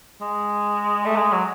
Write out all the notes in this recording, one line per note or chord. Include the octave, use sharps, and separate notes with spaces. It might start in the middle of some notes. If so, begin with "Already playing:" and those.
G#3
A3
G#3
F#3